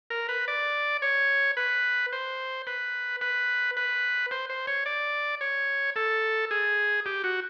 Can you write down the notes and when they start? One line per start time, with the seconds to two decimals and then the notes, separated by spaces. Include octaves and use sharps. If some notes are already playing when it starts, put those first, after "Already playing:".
0.10 A#4
0.29 B4
0.48 D5
1.02 C#5
1.57 B4
2.13 C5
2.67 B4
3.21 B4
3.77 B4
4.31 C5
4.50 C5
4.67 C#5
4.86 D5
5.41 C#5
5.96 A4
6.51 G#4
7.06 G4
7.24 F#4